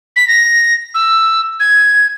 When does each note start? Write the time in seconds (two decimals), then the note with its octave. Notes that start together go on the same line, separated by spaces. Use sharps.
0.16 B6
0.28 A#6
0.95 E6
1.60 G#6